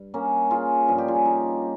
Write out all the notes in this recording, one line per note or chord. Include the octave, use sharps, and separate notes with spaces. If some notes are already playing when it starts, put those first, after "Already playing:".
Already playing: G2
A#3 C#4
F4 G#4
G2 F3 G#4
G4
F4 G#4
D#4 G4